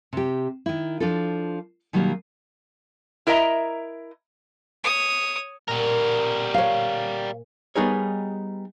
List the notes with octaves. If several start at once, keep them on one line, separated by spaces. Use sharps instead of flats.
C3 G4
D#3 E4
F3 D4 F4 A4
B2 D#3 F#3 G3 A#3
E4 A#4 D#5 E5 A#5
C#5 D#6
A#2 G3 A#4
C#5 F5
G3 B3 D#4 G#4 A#4 C#5